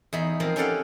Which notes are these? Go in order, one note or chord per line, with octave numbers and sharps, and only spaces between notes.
E2 D#4 B5
F3 A#3 C4 C5
C#4 G4 A4 D5 F5 F#5